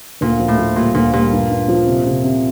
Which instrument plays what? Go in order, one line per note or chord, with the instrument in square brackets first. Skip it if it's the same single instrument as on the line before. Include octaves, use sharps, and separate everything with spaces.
[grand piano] D2 [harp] A#2
[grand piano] F3
[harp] A2
[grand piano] F3
[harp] A#2 [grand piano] G3
[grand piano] D2 [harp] A#2
[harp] A#2 [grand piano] G3
[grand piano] G2
G2
F3
C3
C3
C3